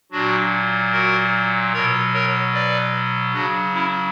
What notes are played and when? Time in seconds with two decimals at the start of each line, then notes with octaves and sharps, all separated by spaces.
0.12 A#2 F#3 D4 F#4
0.92 F#4 A#4
1.73 B2 F#3 A#4 C#5
2.13 A#4 C#5
2.53 B4 D5
3.33 C#3 F#3 D4 F#4
3.73 C#4 E4